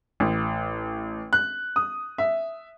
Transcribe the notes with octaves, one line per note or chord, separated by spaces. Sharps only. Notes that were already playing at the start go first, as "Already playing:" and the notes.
A1
F#6
D#6
E5